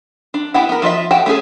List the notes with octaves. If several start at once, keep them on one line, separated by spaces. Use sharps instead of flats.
D4
B3 D4 E4 G4 F#5
B3 A#4
F3 F4 D#5 E5
F#4 G4 F#5 G5 A5
A3 C#4 G#4 A4